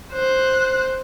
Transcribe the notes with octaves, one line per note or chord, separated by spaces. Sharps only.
C5 F#6